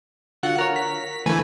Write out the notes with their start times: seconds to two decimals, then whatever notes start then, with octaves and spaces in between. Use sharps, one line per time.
0.43 D3 F4 F#4 F#5
0.58 A#4 C#5
0.76 B6
1.26 D2 E3 A3 B4 G#5